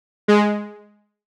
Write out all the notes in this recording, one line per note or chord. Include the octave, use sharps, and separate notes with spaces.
G#3